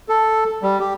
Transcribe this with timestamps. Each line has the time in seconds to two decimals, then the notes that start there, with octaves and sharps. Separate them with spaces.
0.09 A4
0.63 G3
0.80 G4